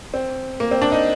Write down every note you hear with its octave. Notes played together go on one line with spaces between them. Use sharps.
C4
A#3
C4
D4
D#4